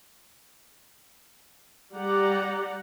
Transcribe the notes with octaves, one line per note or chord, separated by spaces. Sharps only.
G3 G4 D5 F#5 A#5